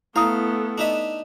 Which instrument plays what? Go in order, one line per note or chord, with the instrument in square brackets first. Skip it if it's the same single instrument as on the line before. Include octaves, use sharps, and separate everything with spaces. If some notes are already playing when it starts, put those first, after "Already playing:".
[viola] A3 B3 [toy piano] E4 A#5 D#6 [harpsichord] F5
[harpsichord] D4 D#4 E5